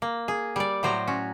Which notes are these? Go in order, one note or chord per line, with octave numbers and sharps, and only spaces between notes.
A#3
G#4
G3 D5
A2 F#3 C5 D5 A#5
C#4 F#4